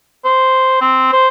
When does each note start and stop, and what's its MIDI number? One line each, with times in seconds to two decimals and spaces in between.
0.25 0.77 72
0.81 1.12 60
1.13 1.28 72